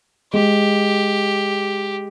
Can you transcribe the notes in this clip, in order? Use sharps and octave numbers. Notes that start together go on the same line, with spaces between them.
G#3 G4